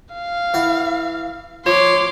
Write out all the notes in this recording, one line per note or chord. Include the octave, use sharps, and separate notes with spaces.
F5
E3 F#5
F3 C#5 C6 D6